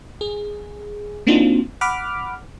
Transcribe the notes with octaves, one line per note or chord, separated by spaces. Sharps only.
G#4
A#3 C4 D4 D#4 F4 F#4
F#5 B5 D6 F6